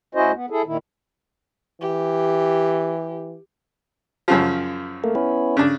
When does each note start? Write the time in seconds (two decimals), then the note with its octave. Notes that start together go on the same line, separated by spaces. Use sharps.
0.15 D2 C#4 E4 F#4 C5 D#5
0.33 B3
0.50 E4 G#4 A4
0.66 D#2 A#2 D#3 E4
1.81 E3 G4
4.28 F#2 C#3 F3
5.04 A3 A#3
5.15 B3 C#4 E4
5.57 C#3 D4